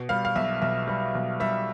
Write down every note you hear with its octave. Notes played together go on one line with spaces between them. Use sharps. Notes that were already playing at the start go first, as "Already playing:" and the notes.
Already playing: B2
G3 F5
F5
B1 E5
B1 E5
G3
B1
G3 E5